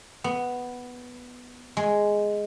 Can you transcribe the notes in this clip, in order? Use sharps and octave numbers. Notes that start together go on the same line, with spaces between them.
B3
G#3